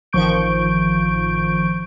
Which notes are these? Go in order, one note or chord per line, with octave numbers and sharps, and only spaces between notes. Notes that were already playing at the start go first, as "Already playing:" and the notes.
A1 D#3 F3 C#6 G6 D7